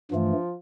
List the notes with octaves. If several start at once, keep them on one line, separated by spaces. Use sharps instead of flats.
G2 E3 F3 A3